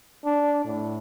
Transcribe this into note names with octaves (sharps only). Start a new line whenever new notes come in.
D4
A2